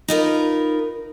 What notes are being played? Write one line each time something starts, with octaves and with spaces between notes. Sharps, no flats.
D#4 F4 A#4 B4